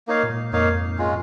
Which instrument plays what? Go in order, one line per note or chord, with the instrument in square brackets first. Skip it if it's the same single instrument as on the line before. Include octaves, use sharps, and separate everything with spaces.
[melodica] A#3 D#4 C#5 F5
[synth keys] A#2
G#2
[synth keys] F2 [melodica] A#3 D#4 C#5 F5
[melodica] G#3 C#4 F4